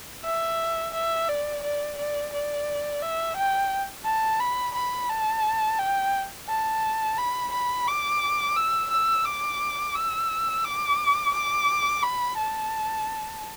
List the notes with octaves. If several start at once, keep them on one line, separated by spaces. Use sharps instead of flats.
E5
E5
D5
D5
D5
D5
E5
G5
A5
B5
B5
A5
G5
A5
B5
B5
D6
E6
E6
D6
E6
D6
D6
B5
A5